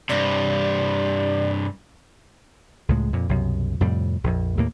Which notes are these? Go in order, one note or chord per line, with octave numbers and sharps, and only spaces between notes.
G2 C3 D5
C#2 A2 G#3
F2 A#2
C2 F#2 B2
F2 A2 C3 G3
A#1 F2
D#2 A2 A#3